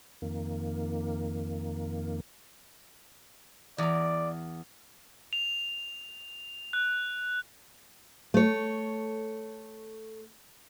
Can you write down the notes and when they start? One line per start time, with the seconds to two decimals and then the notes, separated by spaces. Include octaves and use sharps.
0.22 F2 D#3 A#3
3.78 E2 D5 A#5
5.33 F7
6.73 F#6
8.34 A3 C#5